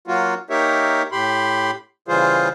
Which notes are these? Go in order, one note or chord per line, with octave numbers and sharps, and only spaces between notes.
F#3 A#3 F4 F#4
A#3 D#4 G4 A#4 C#5 E5
A2 G4 B5 C6
C#3 E3 G3 F4 G#4 C5